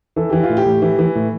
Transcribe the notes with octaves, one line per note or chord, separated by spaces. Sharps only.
E3 A4
E3 G4
F4
A2
G4
A2
E3
E3
A2